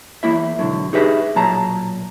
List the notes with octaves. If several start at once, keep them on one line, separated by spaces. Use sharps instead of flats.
E2 A#3 E4 E5
G#2 B2 D3 F#3
D#4 G4 G#4 B4 D#5 E5
B1 A#2 F#3 A5 A#5